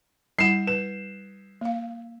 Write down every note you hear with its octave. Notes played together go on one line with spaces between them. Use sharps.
G3 E4 F#5 C7 E7
B4 E7
A#3 F5